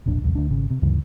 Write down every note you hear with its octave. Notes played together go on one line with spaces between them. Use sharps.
E1 A#1 D4
D#1 C2 F2
D2 D4
G#1 C#3
C3
D2 G2 C#3 E3